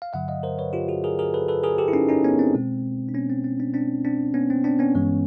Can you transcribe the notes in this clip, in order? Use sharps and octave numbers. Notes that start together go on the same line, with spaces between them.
F5
G2 D3 F#3 E5 F#5
D#5 F5
A#4 C5
B4 C#5
F4 G4
F#4 G#4
G#4 A#4
G#4 A#4
A4 B4
A4 B4
G#4 A#4
G4 A4
E4
C#4 D#4
C#4 D#4
B3 C#4
C4
B2 G#3
D4
B3 C#4
C4
C4
C4 D4
C4 D4
C4 D4
B3 C#4
C4
C4 D4
B3 C#4
G2 E3 G#3